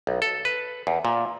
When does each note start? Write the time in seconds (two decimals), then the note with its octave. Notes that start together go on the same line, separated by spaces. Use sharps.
0.07 B1
0.22 A4
0.45 B4
0.87 E2
1.05 A#2